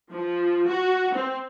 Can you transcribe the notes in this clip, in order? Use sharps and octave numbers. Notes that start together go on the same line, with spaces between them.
F3
F#4
C4